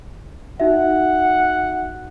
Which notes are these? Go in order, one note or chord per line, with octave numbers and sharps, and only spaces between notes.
D#4 F#4 E5 F#5